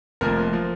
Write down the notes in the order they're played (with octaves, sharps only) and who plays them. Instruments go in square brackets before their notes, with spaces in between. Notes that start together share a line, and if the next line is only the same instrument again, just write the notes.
[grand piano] F1 F2 F3 A#3 A#4
F3 A#3